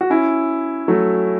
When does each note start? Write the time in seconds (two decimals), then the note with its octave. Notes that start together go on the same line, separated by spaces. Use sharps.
0.01 F#4
0.10 C#4 E4
0.88 F#3 A3